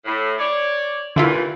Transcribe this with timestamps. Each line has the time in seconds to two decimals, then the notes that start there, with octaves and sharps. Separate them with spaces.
0.05 A2
0.39 C#5 D5
1.16 D#2 D3 E3 E4 F4